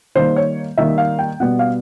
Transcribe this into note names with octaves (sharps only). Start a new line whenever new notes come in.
D#3 G3 A#3 C5
C#5
D#3 G3 A#3 E5
F5
G5
B2 G3 B3 F#5
F5